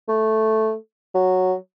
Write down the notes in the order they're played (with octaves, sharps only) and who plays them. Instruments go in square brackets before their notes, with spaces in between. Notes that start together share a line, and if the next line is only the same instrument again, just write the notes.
[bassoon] A3
F#3